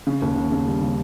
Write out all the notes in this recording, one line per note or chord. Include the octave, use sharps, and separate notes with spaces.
C#3
D#2
C#3
C#3
G3
C#3